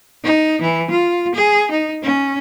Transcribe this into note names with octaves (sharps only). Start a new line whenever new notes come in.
D#4
E3
F4
G#4
D#4
C#4